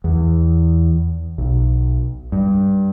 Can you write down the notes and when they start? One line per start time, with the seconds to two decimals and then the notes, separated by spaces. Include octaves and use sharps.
0.04 E2
1.38 B1
2.32 G2